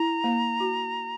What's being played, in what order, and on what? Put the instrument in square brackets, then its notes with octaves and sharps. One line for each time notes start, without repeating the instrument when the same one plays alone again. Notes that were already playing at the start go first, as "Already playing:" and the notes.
Already playing: [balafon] E4 [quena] A#5
[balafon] A#3
F#4